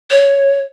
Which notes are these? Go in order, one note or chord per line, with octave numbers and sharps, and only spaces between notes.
C#5